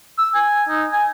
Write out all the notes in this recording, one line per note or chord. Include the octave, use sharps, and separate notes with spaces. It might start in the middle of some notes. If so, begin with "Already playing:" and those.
E6
G#5
D#4
G#5